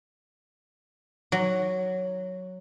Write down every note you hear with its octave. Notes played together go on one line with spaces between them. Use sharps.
F#3